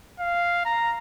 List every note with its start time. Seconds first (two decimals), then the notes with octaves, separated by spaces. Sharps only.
0.19 F5
0.65 A#5